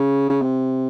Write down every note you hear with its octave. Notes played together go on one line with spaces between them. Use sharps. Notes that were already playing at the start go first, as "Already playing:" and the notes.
Already playing: C#3
C#3
C3